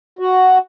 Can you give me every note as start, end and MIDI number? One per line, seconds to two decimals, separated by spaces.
0.19 0.58 66